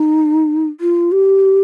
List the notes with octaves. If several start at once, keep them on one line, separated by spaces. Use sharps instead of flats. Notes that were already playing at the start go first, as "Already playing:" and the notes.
Already playing: D#4
F4
G4